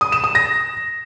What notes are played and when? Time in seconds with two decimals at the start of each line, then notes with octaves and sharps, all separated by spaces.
0.01 D#6
0.12 E7
0.24 D#6
0.35 A#6